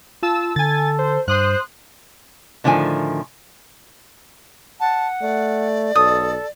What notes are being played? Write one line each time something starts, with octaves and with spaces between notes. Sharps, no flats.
F4 A5 E6
D3 A4 G#5 A6
C5
G2 C5 C6 D#6 F#6
A2 D3 D#3 F3 G#5
F#5 A5
A3 D5
B1 A4 D#6